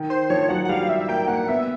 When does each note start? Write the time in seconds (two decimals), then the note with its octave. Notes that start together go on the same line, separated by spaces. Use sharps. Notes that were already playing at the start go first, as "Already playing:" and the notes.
Already playing: D#3
0.10 C5
0.30 F3 C#5
0.49 F#3 F#5
0.65 F#5
0.69 G3 F5
0.89 E5
1.08 A#3 G5
1.28 A#3 F#5
1.47 B3 E5